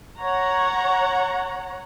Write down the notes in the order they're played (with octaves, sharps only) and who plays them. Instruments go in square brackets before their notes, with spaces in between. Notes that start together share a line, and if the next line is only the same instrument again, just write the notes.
[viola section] C#5 F#5 A#5